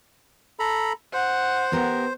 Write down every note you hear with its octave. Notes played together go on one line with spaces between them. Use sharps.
A4 A#5 B5
C5 F#5
B3 G4 A#4